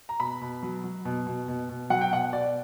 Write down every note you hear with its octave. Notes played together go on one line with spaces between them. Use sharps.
A#5
B2 B5
B2
F#3
F#3
B2
B2
B2
B2
F#3 F#5
G5
B2 F#5
B2 D5